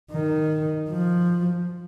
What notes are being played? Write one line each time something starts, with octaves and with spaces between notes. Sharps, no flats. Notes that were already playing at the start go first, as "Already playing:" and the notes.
D#3
F3